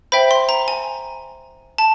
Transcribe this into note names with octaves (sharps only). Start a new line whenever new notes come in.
C5 E5 G5 B5
C6
A#5
G#5
A5